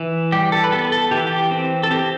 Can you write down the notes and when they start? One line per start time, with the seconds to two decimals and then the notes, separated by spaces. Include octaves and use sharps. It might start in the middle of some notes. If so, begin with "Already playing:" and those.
Already playing: E3
0.32 G3 G4
0.52 A4
0.64 B4
0.72 B3 A4
0.92 A4
1.11 E3 G4
1.27 G4
1.51 C4
1.83 A4
1.91 C4 G4